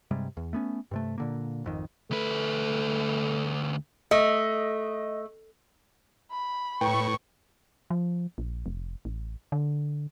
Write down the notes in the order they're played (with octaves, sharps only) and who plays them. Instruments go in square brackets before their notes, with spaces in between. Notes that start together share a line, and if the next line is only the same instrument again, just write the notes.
[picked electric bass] G2 C3 G3 G#3
E2
A3 B3 C#4
G2 C3 A3
A#2 D3 A#3
G#1 F2 D#3
[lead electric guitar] D2 B4 [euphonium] A3
[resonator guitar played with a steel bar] A3 [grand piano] D#5
[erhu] B5
[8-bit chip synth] A2 [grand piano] B4 G5 [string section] C#6
[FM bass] F3
A#1
F1
A1
D3